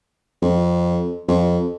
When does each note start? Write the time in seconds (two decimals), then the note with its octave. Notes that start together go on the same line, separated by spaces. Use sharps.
0.42 F2
1.28 F2